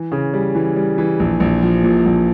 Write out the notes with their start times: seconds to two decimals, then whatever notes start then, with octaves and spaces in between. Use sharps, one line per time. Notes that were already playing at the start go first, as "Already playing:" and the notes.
Already playing: E3
0.12 C#3
0.34 G3
0.55 E3
0.76 G3
0.98 E3
1.20 A#1
1.40 A#1
1.63 F3
1.83 A#2
2.06 A#1